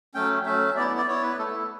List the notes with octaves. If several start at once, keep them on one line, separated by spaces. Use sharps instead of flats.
F#3 A3 C#4 G5
F#3 A3 C#4 E5
B3 E4 D5
D5
D5
B3 E4 C#5
B4
A3 E4 A4